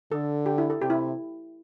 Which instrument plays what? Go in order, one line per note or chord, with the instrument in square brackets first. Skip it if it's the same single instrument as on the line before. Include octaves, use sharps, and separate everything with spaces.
[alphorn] D3 [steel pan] A4
[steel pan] G4
E4
A4
[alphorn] C3 [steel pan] G4
[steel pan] E4